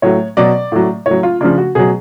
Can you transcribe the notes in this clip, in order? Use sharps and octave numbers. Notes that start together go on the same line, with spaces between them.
A2 F#3 C#5
B2 F#3 D5
A2 F#3
A2 F#3 C#5
F4
C#3 F3 D4
F#4
B2 F#3 G#4